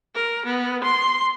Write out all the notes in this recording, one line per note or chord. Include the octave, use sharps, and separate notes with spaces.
A#4
B3
C6